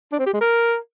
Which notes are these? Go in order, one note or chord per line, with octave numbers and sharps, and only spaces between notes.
D4
C4
G4
G#3
A#4